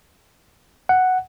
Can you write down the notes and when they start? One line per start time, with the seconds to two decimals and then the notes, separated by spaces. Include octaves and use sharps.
0.89 F#5